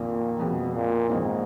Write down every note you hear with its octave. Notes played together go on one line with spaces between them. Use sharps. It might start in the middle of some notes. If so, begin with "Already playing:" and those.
Already playing: F2 A#2 D#3 A#3
F2 B2 F3 G#3 B3
A#2
F2 G#2 D#3 A#3 D#4